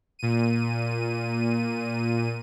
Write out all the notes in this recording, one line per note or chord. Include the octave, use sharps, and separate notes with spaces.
A#2 D#7